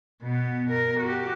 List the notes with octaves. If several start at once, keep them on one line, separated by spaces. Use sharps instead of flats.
B2 B3
A#4
F#4 G4